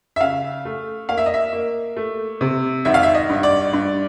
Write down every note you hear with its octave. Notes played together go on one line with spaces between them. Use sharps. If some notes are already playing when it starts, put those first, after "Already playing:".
E5
C#3 F5
A3
A#3 F5
E5
D#5
E5
A#3
A3
C3
G#1 E5
F5
E5
D#5
G2
D5
G2